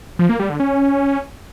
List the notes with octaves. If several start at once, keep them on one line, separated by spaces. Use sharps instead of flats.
F3
A#3
G3
D3
C#4